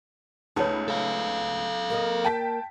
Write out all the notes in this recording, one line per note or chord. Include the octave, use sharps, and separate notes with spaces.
C#2 A3 B3 D#4 G#4 C#5
A4 F5
A#3 A#4 D#5
G5 A5 B6